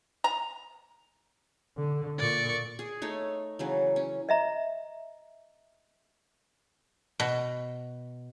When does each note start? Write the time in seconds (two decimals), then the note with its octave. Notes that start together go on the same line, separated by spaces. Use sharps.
0.24 A#5
1.77 D3
2.18 A#2 D5 C#6
2.79 G#4
3.02 A3 D#4 C#5
3.59 C#3 E3 F#3
3.96 C#4
4.29 D#5 E5 A#5
7.20 B2